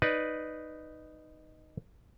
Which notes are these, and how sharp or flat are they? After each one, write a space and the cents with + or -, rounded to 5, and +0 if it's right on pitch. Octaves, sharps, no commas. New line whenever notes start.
D#4 -5 B4 +0 D5 +0